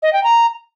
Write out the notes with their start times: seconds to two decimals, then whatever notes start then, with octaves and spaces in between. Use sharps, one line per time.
0.02 D#5
0.13 G5
0.23 A#5